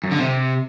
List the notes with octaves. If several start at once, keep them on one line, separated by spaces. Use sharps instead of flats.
F#2
D3
C3